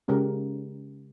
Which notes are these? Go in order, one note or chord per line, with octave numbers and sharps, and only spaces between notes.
C#3 G#3 C#4 G4 A#4